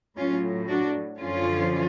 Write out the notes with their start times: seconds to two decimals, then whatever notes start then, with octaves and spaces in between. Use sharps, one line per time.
0.17 A2 F#3 C#4 F4
0.68 D4 F#4
1.19 F#2 D3 F3 C#4 F4